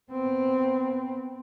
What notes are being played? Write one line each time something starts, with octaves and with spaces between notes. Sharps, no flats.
B3 C4